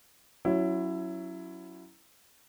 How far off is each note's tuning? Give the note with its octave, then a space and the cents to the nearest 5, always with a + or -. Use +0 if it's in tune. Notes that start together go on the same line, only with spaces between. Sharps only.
F#3 +0 C#4 +0 E4 +15